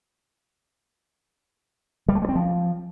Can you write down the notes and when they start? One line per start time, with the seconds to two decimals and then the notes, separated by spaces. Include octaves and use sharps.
2.09 G3
2.15 A3
2.22 G#3
2.29 C4
2.35 F3